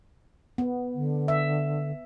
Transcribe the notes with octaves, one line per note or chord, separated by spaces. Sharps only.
B3
D3
E5